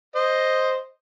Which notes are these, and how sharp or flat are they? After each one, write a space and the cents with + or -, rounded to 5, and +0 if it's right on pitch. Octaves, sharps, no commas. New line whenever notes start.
C5 +0 D#5 +0